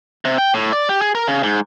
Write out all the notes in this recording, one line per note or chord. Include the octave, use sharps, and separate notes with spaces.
C3
G5
A2
D5
G4
G#4
A#4
C#3
G#2